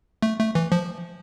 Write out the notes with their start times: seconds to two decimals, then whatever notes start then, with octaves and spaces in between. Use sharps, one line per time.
0.22 A3
0.39 A3
0.55 E3
0.72 F3